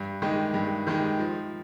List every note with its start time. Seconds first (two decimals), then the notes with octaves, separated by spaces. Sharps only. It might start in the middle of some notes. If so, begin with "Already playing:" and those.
Already playing: G2
0.22 D#3 G#3 D#4 G4
0.54 G2
0.87 D#3 G#3 D#4 G4
1.19 F3